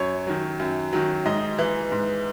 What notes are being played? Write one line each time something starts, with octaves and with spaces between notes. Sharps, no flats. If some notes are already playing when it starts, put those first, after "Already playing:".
Already playing: F#2 C#5
D#3 F#3
F#2
D#3 F#3
G#2 D#5
E3
G#2